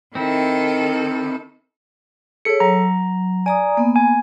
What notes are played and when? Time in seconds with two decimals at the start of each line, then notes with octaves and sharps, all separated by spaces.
0.15 D#3 C4 E4 A4
2.45 G#4 A4 C#5 C#7
2.60 F#3 A#5
3.46 D5 G#5 A#5 D#6
3.77 A#3 B3
3.96 G#5